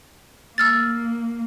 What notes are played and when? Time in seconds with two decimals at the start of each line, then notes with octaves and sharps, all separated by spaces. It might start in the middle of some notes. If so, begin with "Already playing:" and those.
0.58 A#3 E6 F6 A6